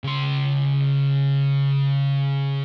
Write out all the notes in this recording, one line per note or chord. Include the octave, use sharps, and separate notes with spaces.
C#3 C6